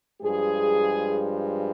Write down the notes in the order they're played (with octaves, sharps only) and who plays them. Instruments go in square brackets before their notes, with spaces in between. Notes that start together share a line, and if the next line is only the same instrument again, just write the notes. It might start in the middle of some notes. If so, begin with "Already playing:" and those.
[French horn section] G2 F3 G#3 G#4